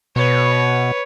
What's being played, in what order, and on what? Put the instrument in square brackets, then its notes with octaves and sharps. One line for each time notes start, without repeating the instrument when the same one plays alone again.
[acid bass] B2 [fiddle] B4 C#5